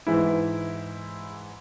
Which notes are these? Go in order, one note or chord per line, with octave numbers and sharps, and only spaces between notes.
G#2 E3 E4